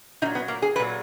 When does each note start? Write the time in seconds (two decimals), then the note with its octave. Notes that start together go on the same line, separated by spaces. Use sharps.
0.22 A#2 D#4
0.26 F#3
0.35 B3
0.48 A#3
0.62 G#4
0.76 A#2 F#3 B4